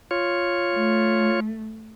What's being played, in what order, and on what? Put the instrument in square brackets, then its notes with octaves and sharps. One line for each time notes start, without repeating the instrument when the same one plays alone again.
[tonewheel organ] F4 C#5
[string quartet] A3